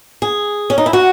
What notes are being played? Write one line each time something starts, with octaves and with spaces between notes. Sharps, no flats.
G#4
C#4
D#4
E4
F#4